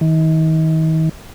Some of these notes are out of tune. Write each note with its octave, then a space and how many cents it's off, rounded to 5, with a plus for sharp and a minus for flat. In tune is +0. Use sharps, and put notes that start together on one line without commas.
D#3 +40